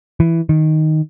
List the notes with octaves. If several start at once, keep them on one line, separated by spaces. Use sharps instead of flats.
E3
D#3